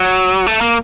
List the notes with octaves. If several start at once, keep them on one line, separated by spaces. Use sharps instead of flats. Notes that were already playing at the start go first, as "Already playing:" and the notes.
Already playing: F#3
A3
A#3